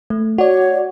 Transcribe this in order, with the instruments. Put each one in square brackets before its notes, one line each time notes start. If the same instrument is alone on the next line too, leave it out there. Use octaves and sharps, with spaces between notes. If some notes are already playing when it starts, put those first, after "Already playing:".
[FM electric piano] A3
[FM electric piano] F#4 D5 [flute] C#5